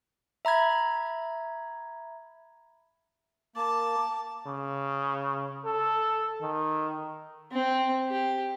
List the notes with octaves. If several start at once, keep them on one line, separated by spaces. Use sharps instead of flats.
E5 A#5 B5 G#6
A#3 A5 D6
C#3
A4
D#3
C4
G4